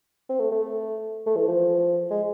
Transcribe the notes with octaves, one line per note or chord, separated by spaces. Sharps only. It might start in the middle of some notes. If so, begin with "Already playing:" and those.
C4
A3
A3
A3
E3
F3
G#3